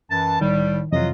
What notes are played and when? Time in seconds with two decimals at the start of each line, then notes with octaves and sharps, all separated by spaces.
0.11 F#2 E3 A5
0.41 C2 A2 D#3 G3
0.92 F2 C3 E3 F#3 F4 D#5